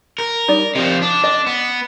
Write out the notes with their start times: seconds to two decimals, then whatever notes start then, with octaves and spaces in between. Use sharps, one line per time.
0.18 A#4
0.48 G3 D#4 D5
0.75 C3 F3 D#5
1.02 D4
1.24 D4 D#5
1.47 B3